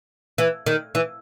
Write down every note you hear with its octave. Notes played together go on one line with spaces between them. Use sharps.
E3
D#3
E3